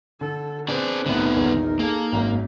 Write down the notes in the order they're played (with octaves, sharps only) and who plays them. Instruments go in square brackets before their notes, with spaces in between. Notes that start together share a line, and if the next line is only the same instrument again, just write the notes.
[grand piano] D3 [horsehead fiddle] A4
[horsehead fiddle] C4 B4 [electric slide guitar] D4 G#4 D5
[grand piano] C2 A2 [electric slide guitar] D3 B3 [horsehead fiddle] D#4 A#4
[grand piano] A#1 E2 D#3
[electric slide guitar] A#3 [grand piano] G#4 A4
[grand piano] G#1 F#2